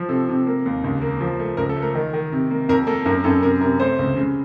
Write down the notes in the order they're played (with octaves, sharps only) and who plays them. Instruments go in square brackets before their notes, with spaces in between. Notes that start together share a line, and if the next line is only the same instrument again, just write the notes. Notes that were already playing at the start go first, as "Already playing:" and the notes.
Already playing: [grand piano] F3
C3 A4
C3
A#3
D#2
C#2
A#3
F3
A3
C#2 A#4
A4
A3
A#4
D#3
D#3
C3
A#3
F2 A#4
A#3 A4
F#2 A#4
F#2 A4
C3 A#4
C3 A#4
A3 C5
C#2
C#3